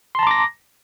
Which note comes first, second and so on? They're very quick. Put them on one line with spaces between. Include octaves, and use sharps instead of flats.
C6 A5 A#5 D6 A#6